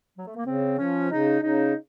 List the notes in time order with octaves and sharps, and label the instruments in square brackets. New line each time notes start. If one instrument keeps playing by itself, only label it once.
[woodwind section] F#3
A3
A#3
[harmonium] C#3 [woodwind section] C4
[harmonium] F3 [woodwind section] C#4
[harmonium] C#3 [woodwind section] D#4
[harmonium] C#3 [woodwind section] D#4